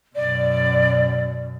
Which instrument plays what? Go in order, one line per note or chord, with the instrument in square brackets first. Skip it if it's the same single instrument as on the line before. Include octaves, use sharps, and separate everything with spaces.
[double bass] F#2 B2 [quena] D5